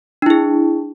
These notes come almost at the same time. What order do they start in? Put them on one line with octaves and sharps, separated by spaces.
D4 E4 G#4